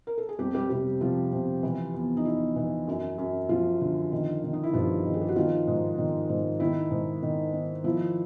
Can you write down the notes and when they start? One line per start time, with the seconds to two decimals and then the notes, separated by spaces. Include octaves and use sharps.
0.07 A#4
0.18 A4
0.29 G#4
0.38 F2 G3 G4
0.54 G3 G4
0.70 C3 G3 G4
1.00 C3 F3 F4
1.32 C3
1.63 E3
1.94 E2
2.17 D#4
2.25 E2 E4
2.56 E3
2.87 F#2
3.18 F#2
3.49 F#2 F3 F4
3.81 D3
4.12 D#3
4.43 D#3
4.53 D#4
4.63 E4
4.73 G2 F3 F4
5.05 D#3
5.13 G#4
5.21 G4
5.28 F#4
5.36 D#3 F3 F4
5.67 G#2
5.98 D#3
6.29 G#2
6.60 D#3 E4
6.91 G#2
7.22 D#3
7.53 D#3
7.84 F3 E4